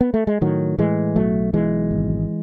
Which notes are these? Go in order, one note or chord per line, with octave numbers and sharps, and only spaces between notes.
B3
A3
G#3
A2 D#3 F#3
A2 E3 G#3
B1 F#3 A3
B1 E3 G#3
G#1